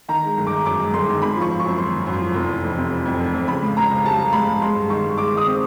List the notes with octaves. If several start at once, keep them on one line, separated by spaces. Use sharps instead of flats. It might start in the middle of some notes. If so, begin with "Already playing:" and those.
D#3 A#5
G#3
G1
D#3 D6
F#2 D6
G#3
G1 C6
D#3
G#1 B5
F3 C#6
F3
C#6
F#2
G#1 C6
G#1
F#2
F3
F1
E3
F2
C3
E3
F2
F1
F2
C#3 B5
C#2
C#2 A#5
C#2
G3 A5
G3
C#2 B5
C#2
G#3 C6
G2
D#3 C#6
G2
G#3 D6
D#3 D#6
C4